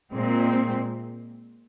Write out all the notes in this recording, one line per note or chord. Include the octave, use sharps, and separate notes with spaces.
A#2 G#3 C4